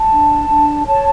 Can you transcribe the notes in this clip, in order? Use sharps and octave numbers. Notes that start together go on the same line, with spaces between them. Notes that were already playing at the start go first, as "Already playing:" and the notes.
Already playing: A5
D4
D4
C#5 A5